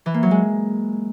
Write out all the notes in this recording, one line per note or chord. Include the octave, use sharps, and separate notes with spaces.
E3
A#3
F#3
G#3